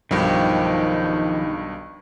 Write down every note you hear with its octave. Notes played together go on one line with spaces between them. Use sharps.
B1 G2 D#3 F3 G4